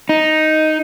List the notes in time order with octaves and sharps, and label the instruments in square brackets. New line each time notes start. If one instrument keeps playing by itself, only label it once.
[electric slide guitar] D#4